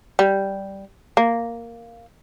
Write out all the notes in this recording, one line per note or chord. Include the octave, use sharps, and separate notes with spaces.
G3
A#3